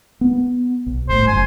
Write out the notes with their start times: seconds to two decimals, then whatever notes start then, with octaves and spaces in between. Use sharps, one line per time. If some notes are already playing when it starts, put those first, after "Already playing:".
0.21 B3
0.86 B1
1.09 G1 A2 C5
1.27 F#1 G#5